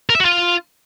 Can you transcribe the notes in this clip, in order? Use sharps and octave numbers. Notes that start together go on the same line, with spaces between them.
A#4
E5
F#4
F4